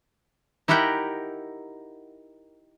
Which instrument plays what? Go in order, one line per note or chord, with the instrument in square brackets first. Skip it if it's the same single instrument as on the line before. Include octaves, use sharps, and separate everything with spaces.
[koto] D#4 E4 G4 A#4 F#5 G5